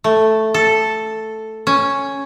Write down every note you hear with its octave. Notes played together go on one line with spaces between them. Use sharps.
A3
A4
C#4